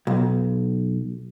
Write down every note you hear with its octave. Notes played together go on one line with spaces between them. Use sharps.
B1